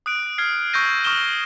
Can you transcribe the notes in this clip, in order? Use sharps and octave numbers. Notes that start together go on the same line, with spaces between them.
D#6 F#6 D7
F6 G#6 C7
C#6 E6 G6 A#6 D#7
C#6 D#6 F6 G6 E7 G7